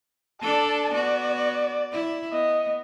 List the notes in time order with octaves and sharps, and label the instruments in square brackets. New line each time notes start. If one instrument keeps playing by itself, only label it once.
[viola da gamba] D4 A4 D5 [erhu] A5
[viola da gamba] B3 F#4 [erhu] D5
[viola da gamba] E4
[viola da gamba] B3 [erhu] D#5